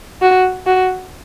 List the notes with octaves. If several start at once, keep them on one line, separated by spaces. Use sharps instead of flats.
F#4
F#4